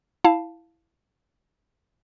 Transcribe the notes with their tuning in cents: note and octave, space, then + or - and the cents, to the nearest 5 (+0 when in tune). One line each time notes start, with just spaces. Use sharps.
E4 +0 F5 +0 A5 +0